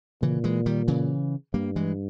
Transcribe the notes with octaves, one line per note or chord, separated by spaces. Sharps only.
A#2 C#3 E3
E3 G#3
D#3 G3
C#3 E3
G2 G3 A#3
E3 G#3